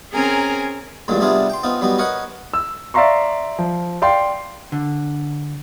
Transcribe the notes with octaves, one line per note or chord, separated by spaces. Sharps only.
C4 C#4 G#4 A#4 G#5 A#5
A1 G2 A#2 D3 F#3 G#3
C3 G3 B3 D4 F4 G#4
G5 C6
B3 C4 D#4 F4
F#3 G3 B3 D#4
A#4 B4 C#5 D#5 F#5 B5
E6
D5 E5 F5 A#5 C6 C#6
F3
D5 F5 G5 C6
D3